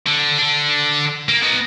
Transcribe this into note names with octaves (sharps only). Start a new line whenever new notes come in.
D3
D3 D4
A#3
B3 D#4